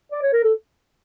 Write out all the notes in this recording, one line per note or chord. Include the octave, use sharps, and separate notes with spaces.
D5
C#5
A#4
A4